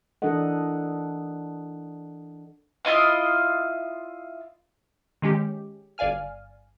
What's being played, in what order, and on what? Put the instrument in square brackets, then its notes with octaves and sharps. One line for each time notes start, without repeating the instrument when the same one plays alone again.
[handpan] E3 D4 A4 A#4 D#5 F#5
[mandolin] E4 F4 D#5 F5
[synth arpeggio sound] D#3 G#3 C#4 G4
G1 D5 F5 G#5 F6